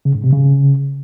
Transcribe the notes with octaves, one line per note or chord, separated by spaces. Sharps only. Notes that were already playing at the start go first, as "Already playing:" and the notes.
C#3
G#2
C3
C#3